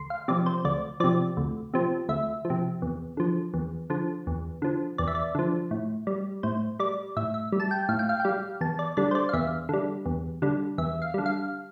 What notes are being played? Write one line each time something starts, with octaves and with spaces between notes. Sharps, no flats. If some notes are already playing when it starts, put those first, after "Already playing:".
Already playing: D2 C6
F5
C3 F3 D5
C5
D2 D5
C3 F3 D5
D2
C3 F3
D2 E5
F3
C3
E2
D3 F3
E2
D3 F3
E2
D3 F3
E2 D5
E5
D5
D3 F3
A2
G3
A2 C5
G3 D5
A2 E5
E5
G3
A5
G5
A2 F5
G5
F5
G5
G3 F5
E2 A5
D5
D3 G3 D5
C5
D5
F5
E2 E5
D3 G3
E2
D3 G3
E2 E5
F5
D3 G3
F5